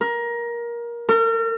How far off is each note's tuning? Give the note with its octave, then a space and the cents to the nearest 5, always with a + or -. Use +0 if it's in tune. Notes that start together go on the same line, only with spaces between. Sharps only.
A#4 +20
A#4 -40